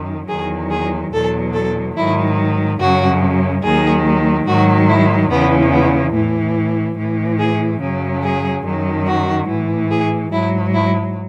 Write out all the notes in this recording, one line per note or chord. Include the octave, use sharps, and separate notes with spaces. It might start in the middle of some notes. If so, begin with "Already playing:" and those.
Already playing: F#2 D#3
E2 D#3 F#3 G#4
G#4
E2 B2 F#3 A4
A4
G#2 D#3 F#3 E4
F#2 C#3 F#3 F#4
D#2 D#3 F#3 G#4
G#2 D#3 F#3 F#4
E4
E2 C#3 E3 B3
B3
A2 E3
A2 E3
G#4
F#2 C#3 F#3
G#4
F#2 D#3 F#3
F#4
A2 E3
G#4
G#2 F#3 E4
E4